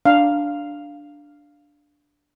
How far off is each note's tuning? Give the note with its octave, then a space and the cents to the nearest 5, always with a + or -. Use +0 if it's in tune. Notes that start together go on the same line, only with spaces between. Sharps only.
D4 -5 F5 +0